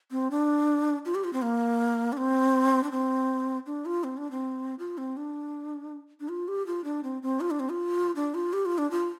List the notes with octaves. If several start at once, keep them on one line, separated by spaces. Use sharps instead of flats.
C4
D4
F4
G4
F4
C4
A#3
D4
C4
D4
C4
D4
F4
C4
D4
C4
F4
C4
D4
D4
F4
G4
F4
D4
C4
C4
F4
D4
C4
F4
D4
F4
G4
F4
D4
F4